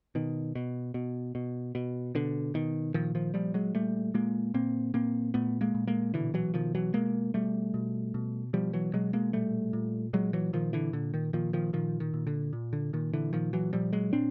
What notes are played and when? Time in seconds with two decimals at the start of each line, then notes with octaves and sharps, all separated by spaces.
0.15 B2 D#3
0.55 B2
0.94 B2
1.35 B2
1.75 B2
2.15 B2 D3
2.54 B2 D#3
2.94 A#2 D#3 F3
3.15 D#3 F3
3.34 A#2 F3 G3
3.54 F#3 G#3
3.75 A#2 G3 A3
4.14 A#2 G#3 A#3
4.54 A#2 A#3 C4
4.94 A#2 A#3 C4
5.34 A#2 A3 B3
5.61 G#3 A#3
5.75 A#2
5.87 G#3 A#3
6.14 B2 D3 E3
6.34 E3 F#3
6.54 B2 D#3 F3
6.75 E3 F#3
6.94 B2 G#3 A#3
7.34 B2 G3 A3
7.74 B2
8.14 B2
8.53 B2 F3 G3
8.73 E3 F#3
8.93 B2 F#3 G#3
9.13 G#3 A#3
9.33 A#2 G3 A3
9.73 A#2
10.13 A#2 F#3 G#3
10.33 E3 F#3
10.53 A#2 D#3 F3
10.73 D3 E3
10.93 A#2 D3
11.14 D#3
11.33 A#2 D#3 F3
11.53 D#3 F3
11.73 A#2 D#3 F3
12.00 D#3
12.13 A#2
12.27 D3
12.53 A#2
12.73 D3
12.93 A#2 D#3
13.13 D3 E3
13.33 A#2 D#3 F3
13.53 E3 F#3
13.73 A#2 F3 G3
13.93 F#3 G#3
14.13 A#2 C4 D4